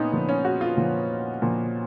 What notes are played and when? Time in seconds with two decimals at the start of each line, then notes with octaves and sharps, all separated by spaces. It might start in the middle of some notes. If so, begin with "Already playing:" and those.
Already playing: A#2 B3 C#4 D#4
0.13 A#2 F3
0.29 C#4
0.45 F#4
0.61 F4
0.77 A#2 F3
1.42 A#2 F3